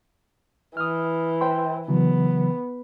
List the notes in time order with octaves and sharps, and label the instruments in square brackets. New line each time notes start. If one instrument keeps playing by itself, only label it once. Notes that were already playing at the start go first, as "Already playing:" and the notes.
[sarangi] E3 [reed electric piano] D#6 F6
[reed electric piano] C5 G5 C6
[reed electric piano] C#3 E3 F#3 [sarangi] B3